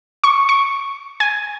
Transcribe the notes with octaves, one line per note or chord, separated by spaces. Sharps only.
C#6
C#6
G#5